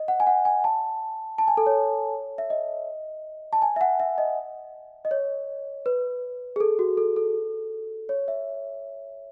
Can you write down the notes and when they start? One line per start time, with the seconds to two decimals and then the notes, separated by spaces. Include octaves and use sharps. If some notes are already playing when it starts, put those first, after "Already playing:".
Already playing: D#5
0.08 F#5
0.20 G#5
0.27 F#5
0.45 G#5
0.64 A5
1.38 A5
1.48 G#5
1.57 A4
1.66 C#5
2.38 E5
2.50 D#5
3.53 A5
3.62 G#5
3.76 E5
3.81 F#5
4.00 E5
4.18 D#5
5.05 D#5
5.11 C#5
5.86 B4
6.56 G#4
6.60 A4
6.79 F#4
6.97 A4
7.16 A4
8.09 C#5
8.28 E5